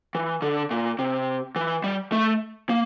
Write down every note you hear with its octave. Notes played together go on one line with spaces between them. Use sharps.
E3
D3
A#2
C3
E3
G3
A3
A#3